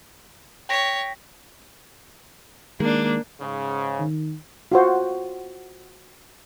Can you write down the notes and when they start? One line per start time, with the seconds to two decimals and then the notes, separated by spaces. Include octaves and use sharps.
0.69 C#5 G5 A#6 B6
2.80 D#3 G#3 A#3 D4
3.40 G#2 C#3
4.00 D#3
4.72 F4 F#4 C5